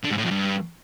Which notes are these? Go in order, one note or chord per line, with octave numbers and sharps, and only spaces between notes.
D3
G#2
A2
F2
G2